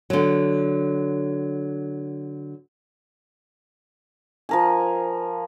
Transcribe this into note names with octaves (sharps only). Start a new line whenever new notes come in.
D3 F#3
F3 A#4 G#5